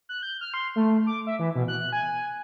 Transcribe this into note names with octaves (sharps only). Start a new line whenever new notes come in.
F#6
G6
F6
C6
A3
D6
E5
E3
B2
F#6
G#5